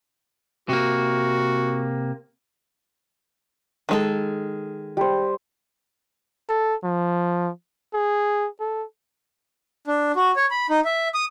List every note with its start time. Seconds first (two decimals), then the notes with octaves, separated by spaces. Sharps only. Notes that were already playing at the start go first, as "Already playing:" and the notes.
0.69 C3 A#3 F#4
3.89 D#3 G#3 A4
4.97 G3 C5
6.49 A4
6.84 F3
7.94 G#4
8.60 A4
9.87 D4
10.16 F#4
10.36 C#5
10.51 B5
10.70 D#4
10.85 E5
11.14 D#6